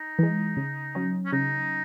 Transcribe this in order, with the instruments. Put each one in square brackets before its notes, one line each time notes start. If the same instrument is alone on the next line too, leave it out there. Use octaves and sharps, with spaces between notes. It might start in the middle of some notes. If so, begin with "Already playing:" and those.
Already playing: [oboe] D#4
[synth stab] E3 G#3
C#3
F#3 C#4
[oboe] C#4
[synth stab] C#3 [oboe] D#4